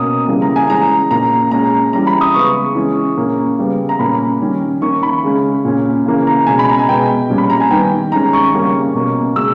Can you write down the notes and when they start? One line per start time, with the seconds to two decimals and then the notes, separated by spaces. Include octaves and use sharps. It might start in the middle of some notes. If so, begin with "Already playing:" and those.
Already playing: B2 A#3 C#4 D#6
0.28 C#3 E3 G3 A#3 C#4
0.42 A#5
0.56 G#5
0.69 E3 G#3 C#4 A#5
1.11 A#2 A#3 C#4 A#5
1.51 A#2 G#3 C#4 A#5
1.93 E3 G3 C#4 A#5
2.07 B5
2.21 D#6
2.34 C#3 G#3 B3 C#6
2.75 E3 G#3 C#4
3.17 A#2 A#3 C#4
3.58 C#3 G3 B3
3.89 A#5
3.99 A#2 A#3 C#4 B5
4.41 D#3 G3 C#4
4.81 D#3 A#3 C#4 C#6
5.03 B5
5.24 C#3 G#3 C#4
5.65 A#2 A#3 C#4
6.05 C#3 E3 A#3 C#4
6.27 A#5
6.47 B2 G#3 C#4 G#5
6.59 B5
6.69 A#5
6.79 G#5
6.89 B2 G#3 B3 G5
7.30 A#2 G3 C#4
7.38 B5
7.50 A#5
7.60 G#5
7.71 D#3 G3 B3 G5
8.12 D#3 G#3 C#4 A#5
8.33 C#6
8.54 C#3 G3 A#3 C#4
8.95 B2 A#3 C#4
9.36 B2 G#3 C#4 E6